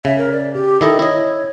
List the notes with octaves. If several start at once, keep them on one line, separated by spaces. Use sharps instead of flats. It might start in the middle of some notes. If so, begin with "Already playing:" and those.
C#3 E5
A#4
D5
G4
D#3 E4 A4 D#5
E4 C#5 D#5